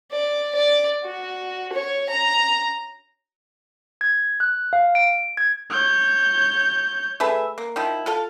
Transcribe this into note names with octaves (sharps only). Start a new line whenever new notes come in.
D5
D5
F#4
C#5
A#5
G#6
F#6
F5
D7
G#6
C#5 G6
A3 G#4 B4 E5
A#3
D#3 F3 E4
F4 A4 F5